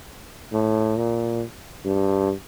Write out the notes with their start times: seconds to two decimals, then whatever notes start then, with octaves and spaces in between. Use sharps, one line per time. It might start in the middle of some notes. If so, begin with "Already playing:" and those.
0.53 A2
0.97 A#2
1.85 G2